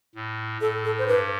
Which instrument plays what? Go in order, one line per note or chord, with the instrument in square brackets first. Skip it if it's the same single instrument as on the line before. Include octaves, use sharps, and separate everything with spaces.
[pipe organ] A2
[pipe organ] A2 [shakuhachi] A4
[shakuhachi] A4
C5
[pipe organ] G2 [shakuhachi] B4